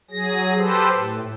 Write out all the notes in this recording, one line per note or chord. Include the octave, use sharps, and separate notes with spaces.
F#3 G#4 A#6
G4 A4 B4 C5
A2